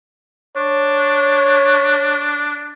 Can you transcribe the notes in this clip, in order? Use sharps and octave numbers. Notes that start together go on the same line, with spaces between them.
D4 C#5